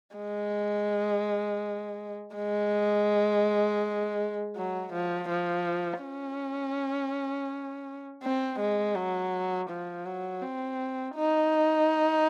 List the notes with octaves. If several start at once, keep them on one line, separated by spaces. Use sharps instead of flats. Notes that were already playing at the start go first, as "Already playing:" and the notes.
G#3
G#3
F#3
F3
F3
C#4
C4
G#3
F#3
F3
F#3
C4
D#4